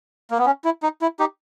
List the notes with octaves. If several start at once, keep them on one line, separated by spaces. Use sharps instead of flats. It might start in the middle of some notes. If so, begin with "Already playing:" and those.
A#3
B3
C#4
E4
D#4
E4
D#4 G4